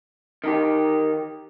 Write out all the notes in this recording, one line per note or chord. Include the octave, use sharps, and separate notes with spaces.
D#3 D#4 G4